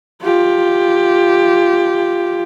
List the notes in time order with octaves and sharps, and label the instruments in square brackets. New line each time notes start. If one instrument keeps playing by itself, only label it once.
[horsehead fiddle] F4 G4